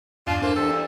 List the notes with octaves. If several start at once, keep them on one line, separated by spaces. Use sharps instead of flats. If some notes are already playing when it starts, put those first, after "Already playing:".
E2 G2 C#4 D4 F4
A#3 D4 E4 A4 C5
E2 G2 A4